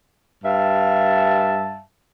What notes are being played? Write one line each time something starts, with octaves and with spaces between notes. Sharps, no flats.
G2 E5 F5 A5